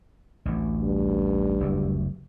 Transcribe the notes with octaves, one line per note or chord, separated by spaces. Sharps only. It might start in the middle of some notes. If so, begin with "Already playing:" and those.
A1 D2
G2
F#1 D2